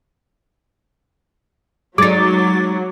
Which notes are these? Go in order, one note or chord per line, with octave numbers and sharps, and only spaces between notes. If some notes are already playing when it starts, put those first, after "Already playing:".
F#3 G#3 D#4 D6 A6